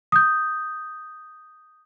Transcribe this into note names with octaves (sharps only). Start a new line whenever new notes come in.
D#6 G6